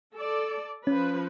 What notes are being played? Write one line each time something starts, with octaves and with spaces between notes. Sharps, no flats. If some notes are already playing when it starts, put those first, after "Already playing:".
A4 D5
F3 C#4 B4